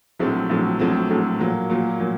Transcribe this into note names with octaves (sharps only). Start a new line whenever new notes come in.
A#1 A2 F#3 A3 C4
A#1 A2 F#3 A3 C4
A#1 A2 F#3 A3 C4
A#1 A2 F#3 A3 C4
A#2 F#3 A#3
A#2 F#3 A#3
A#2 F#3 A#3